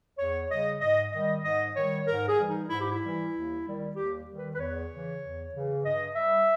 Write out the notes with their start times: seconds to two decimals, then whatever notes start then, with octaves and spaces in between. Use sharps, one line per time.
0.19 E2 C#5
0.49 C#3 G3 D#5
0.81 G#2 D#5
1.12 D#3 G3 D#5
1.44 G#2 D#5
1.75 D#3 G3 C#5
2.06 G#2 A#4
2.28 G#4
2.38 E3 G3
2.49 D#4
2.69 G#2 E4
2.81 G4
2.92 E4
3.01 E3 G3
3.33 D#2
3.65 D#3 G3
3.96 D#2 G4
4.28 D#3 G3
4.38 B4
4.54 B4
4.59 E2 C#5
4.91 C#3 E3
5.22 E2
5.54 C#3 E3
5.85 G2 D#5
6.16 G3 E5